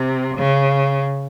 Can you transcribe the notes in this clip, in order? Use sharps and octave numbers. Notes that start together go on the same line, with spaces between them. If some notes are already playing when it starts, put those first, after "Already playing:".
Already playing: C3
C#3